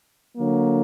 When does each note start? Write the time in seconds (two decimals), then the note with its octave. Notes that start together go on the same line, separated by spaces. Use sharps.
0.37 D3 F#3 A#3